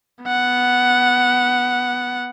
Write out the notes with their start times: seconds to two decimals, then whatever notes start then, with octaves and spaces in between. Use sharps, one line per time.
0.24 B3 F#5